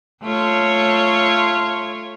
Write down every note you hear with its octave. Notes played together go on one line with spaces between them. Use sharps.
A3 F4 C#5